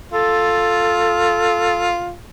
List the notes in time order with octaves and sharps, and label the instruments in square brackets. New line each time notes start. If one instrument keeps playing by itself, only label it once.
[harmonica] F4 [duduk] A4